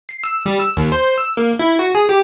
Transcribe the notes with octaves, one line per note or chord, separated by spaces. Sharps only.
C7
E6
G3
E6
D#2
C5
E6
A#3
E4
F#4
G#4
G4